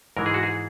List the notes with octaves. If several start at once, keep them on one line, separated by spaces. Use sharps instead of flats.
G#2 E3 G#3 A#4
G#4
F#4
G#4